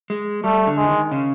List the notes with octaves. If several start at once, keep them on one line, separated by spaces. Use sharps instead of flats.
G#3
G3 A3
D3
G#3
D#3
C#3